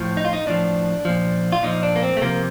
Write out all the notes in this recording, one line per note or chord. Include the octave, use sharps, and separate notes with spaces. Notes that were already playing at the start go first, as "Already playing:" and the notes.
Already playing: A2 F3
D#4
F4
D#4
A2 F3 D4
A#2 F3
F4
A#2 F3 D#4
D4
A#3
C4
A3
C3 F3 A#3